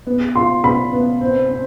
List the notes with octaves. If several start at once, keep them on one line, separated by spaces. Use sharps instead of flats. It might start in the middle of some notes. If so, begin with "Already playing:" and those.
B3
F4 C6
B3 B5
B3
C4
C4